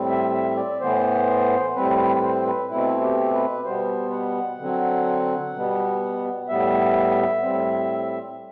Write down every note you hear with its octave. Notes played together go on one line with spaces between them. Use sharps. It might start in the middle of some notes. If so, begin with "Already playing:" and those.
Already playing: A2 G3 C4
E5
E5
D5
A2 E3 B3 C5
A2 G3 C4 B4
B4
C5
B4
B2 A3 C4 E4
G4
B4
B2 G3 B3 C5
F#5
D3 F#3 C4
B2 G3 B3
A2 G3 B3 E5
A2 G3 C4